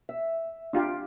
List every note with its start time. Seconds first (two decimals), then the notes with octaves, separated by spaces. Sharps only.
0.09 E5
0.73 D4 F4 G4